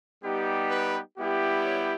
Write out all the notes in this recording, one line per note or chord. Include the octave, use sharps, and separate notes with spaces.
G3 B3 D#4 G4
B4
G3 B3 E4 G4
C#5